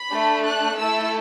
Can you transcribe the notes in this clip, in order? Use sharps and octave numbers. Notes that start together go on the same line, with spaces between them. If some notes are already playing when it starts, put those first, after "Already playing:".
Already playing: B5
A3 D4 A4
F#6
A3 E4 A4 E6